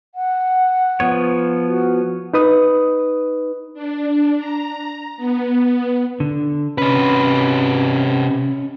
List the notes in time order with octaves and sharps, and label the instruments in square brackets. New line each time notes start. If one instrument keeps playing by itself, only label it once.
[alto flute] F#5
[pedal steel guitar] F3 B3 C#5
[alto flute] F#4
[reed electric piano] D#4 B4 D#6
[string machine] D4
A#5
B3
[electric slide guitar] D3
[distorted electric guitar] C3 B4 [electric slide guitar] C#4